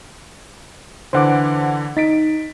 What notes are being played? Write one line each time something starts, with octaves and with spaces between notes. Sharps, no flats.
D3 E3 C5 F#5 D6
D#4 A6 B6 D7